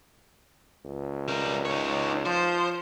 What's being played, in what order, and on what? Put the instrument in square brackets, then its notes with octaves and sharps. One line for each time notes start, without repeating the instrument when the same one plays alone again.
[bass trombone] C#2
[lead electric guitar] G3 A#4
D#4 C#5
[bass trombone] F3 [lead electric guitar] C5